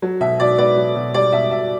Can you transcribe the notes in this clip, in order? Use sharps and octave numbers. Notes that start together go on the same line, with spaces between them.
F#3
B2 E5
B2 D5
B3 D5
F#3
B2
G3 D5
B2 E5
B2 E5